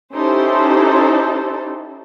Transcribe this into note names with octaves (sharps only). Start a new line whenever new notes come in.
C#4 D#4 E4 G4 A4 C5